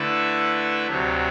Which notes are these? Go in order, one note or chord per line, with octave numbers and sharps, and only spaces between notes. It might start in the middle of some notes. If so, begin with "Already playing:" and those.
Already playing: D3 A3 E4 B4 E5
D2 C3 F#3 C4 F#4